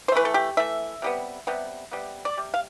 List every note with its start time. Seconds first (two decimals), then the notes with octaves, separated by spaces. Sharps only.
0.08 C5
0.12 E3 A3 B4
0.25 A4
0.34 G4
0.57 E3 A3 E5
1.02 C3 G3 B3
1.47 C3 G3 B3
1.92 C3 G3 B3
2.25 D5
2.37 C3 G3
2.54 F5